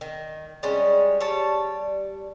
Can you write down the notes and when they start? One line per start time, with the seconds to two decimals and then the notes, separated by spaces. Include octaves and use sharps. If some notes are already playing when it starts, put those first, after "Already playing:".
0.01 D#3
0.63 G3 G#3 C#4
1.20 G3 C#5 A5